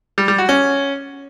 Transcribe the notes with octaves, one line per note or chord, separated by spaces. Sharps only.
G3
G3
F#4
C#4